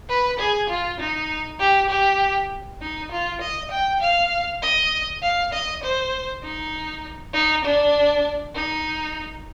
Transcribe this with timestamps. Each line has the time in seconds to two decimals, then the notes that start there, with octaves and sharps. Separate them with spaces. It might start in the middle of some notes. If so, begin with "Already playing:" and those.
0.09 B4
0.39 G#4
0.69 F4
1.00 D#4
1.60 G4
1.89 G4
2.81 D#4
3.11 F4
3.41 D#5
3.71 G5
4.01 F5
4.62 D#5
5.22 F5
5.53 D#5
5.83 C5
6.43 D#4
7.34 D#4
7.64 D4
8.55 D#4